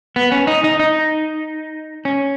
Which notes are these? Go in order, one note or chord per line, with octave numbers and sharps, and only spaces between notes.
B3
C#4
D#4
D#4
D#4
C#4